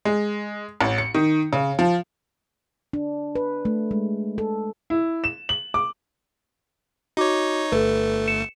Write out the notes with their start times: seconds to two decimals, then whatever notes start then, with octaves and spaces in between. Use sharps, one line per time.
0.05 G#3
0.81 A1
0.98 C#7
1.14 D#3
1.53 C#3
1.79 F3
2.93 D4
3.35 B4
3.65 A3
3.91 G#3
4.38 A4
4.90 E4
5.24 E7
5.49 F#7
5.74 D6
7.17 D#4 F#4 C#5 D6
7.72 G1 A3 A4 B4
8.28 C#7 E7